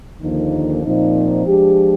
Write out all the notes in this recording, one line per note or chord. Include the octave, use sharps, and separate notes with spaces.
D#2 D3 F3 A#3 D#4
A#2 F3 C4 D#4
F3 G#3 D4 G4